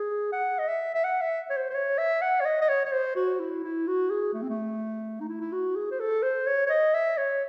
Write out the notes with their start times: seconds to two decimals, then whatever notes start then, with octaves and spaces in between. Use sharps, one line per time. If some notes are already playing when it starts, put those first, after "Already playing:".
Already playing: G#4
0.33 F#5
0.59 D#5
0.68 E5
0.95 E5
1.04 F#5
1.21 E5
1.50 C#5
1.57 C5
1.70 C5
1.75 C#5
1.98 E5
2.22 F#5
2.41 C#5
2.45 D#5
2.61 D#5
2.69 C#5
2.86 C#5
2.92 C5
3.16 F#4
3.40 E4
3.64 E4
3.87 F#4
4.11 G#4
4.34 A3
4.42 C4
4.50 A3
5.21 D#4
5.29 E4
5.41 E4
5.53 F#4
5.76 G#4
5.91 C5
6.00 A4
6.23 C5
6.47 C#5
6.66 C#5
6.70 D#5
6.94 E5
7.17 C#5